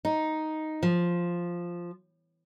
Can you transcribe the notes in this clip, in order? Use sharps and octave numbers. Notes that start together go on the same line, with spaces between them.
D#4
F3